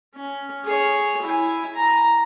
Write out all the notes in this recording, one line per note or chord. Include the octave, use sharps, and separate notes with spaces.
C#4
G#4 C#5
E4 G#5
A#5